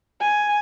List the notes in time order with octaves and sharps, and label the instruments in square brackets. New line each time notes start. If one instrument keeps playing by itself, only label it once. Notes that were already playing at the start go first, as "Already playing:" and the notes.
[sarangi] G#5